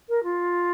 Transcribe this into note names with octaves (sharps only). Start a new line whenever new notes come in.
A#4
F4